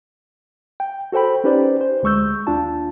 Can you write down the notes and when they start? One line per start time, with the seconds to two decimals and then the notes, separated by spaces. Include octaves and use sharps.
0.80 G5
1.12 F#4 A4 C5 G5 B5
1.44 C#4 D#4 G4 B4 C5 D5
1.81 C5
2.03 D2 G#3 C#6 E6 G6
2.47 D#2 D4 F4 A5